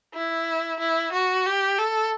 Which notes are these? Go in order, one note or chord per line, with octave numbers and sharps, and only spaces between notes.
E4
E4
F#4
G4
A4